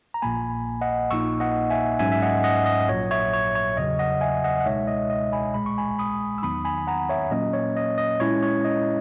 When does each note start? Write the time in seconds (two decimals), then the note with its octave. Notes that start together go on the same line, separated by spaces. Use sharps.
0.14 A#5
0.22 A#1 A#2 A#3 G#5 B5
0.81 D#5 F#5
1.11 A#1 A#2 A#3 D#4 C#6 E6
1.40 D#5 F#5
1.70 E5 G#5
1.99 G#2 F#3 C#4 E5 G#5
2.12 E5
2.22 D#5 F#5
2.44 D#5 F#5
2.66 D#5
2.89 A#1 A#2 F#3 C#5
3.11 C#5 E5
3.33 C#5
3.55 C#5
3.77 E2 C#3 F#3 D#5
3.99 D#5 F#5
4.21 E5 G#5
4.44 D#5 F#5
4.60 F#5
4.65 C#2 B2 G#3 D#4 C#5 E5
4.87 D#5
5.10 D#5
5.33 G#5 B5
5.54 A#1 A#2 G#3 B5
5.66 C#6
5.78 G#5 B5
5.99 B5 D#6
6.38 E6
6.43 E2 D#3 F#3 B3 D#4 B5 D#6
6.65 G#5 B5
6.87 F#5 A#5
7.09 C#5 E5
7.31 A#2 F#3 A#3 C#4 D#5
7.53 C#5
7.76 D#5
7.98 D#5
8.20 A#2 G#3 C#4 E4 C#5
8.42 C#5
8.65 D#5